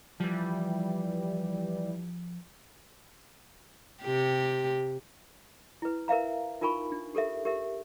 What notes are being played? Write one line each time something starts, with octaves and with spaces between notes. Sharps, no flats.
E3 F3 G3
C3 G4
E4 B4
A#4 B4 E5 F5 A#5
D#4 F4 A#4 G#5 B5 C#6
D4
G4 A4 A#4 E5
G4 A#4 E5